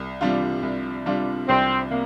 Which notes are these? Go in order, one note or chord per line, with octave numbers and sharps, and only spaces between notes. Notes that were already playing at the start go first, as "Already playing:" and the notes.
Already playing: C2
C3 G3 D4 F4
C2
C3 G3 D4 F4
C2 C4
C3 A#3